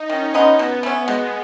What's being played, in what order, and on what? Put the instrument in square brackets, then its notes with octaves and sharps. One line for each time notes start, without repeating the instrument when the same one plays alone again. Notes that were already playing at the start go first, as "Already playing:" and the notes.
Already playing: [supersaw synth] D#4
[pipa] D#3 [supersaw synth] C#4
[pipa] G#3 B3 D#4
[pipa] B2 [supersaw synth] B3
[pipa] A3 C#4
[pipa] B2 [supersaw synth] G#3